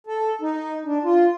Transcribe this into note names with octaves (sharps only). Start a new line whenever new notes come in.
A4
D#4
D4
F4